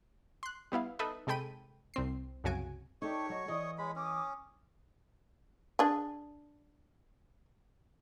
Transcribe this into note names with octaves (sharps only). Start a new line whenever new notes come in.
C6 F#6
G3 B3 E4 F5
D#4 A4 B4 D#5 E5 B5
C3 G#3 A4 G5 B5 D#7
C2 C4 C7
C2 F#2 C#3 F#4 G#5 D7
D#4 G4 A4 C#5 C#6
F#3 D#5
E3 D#5 D#6
G#3 C#5 B5
C#4 D6 D#6
D4 G#4